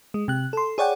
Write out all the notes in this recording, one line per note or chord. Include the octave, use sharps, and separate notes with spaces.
G#3
C3 F#6
A4 C6
G#4 C#5 D5 F#5 G5